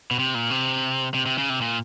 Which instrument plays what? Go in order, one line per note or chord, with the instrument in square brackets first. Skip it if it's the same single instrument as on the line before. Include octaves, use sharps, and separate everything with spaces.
[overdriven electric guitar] B2
C3
A#2
C3
C3
C3
C#3
C3
A#2